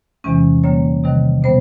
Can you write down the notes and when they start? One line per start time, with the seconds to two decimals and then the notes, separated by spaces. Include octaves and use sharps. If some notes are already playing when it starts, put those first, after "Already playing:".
0.24 E2 C3 E3 G#3 C#4
0.64 D3 G3 A#3 C#5
1.04 C3 D#3 G3
1.43 B2 G3 B3 C5